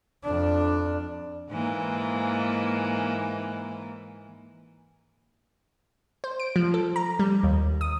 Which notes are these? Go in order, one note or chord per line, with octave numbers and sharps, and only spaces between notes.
F2 D4
G#2 E3 A#3
C5
D7
F3
A4
A#5
G3
D#2
D#6